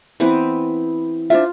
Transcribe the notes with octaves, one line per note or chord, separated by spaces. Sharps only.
E3 B3 C4 B4
D4 F4 C5 E5